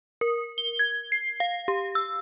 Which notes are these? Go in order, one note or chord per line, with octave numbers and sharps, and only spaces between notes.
A#4
G7
G#6
C7
F5
G4
E6